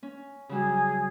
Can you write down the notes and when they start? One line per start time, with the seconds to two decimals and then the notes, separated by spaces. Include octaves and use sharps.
0.03 C#4
0.49 C#3 F#3 G3 G#4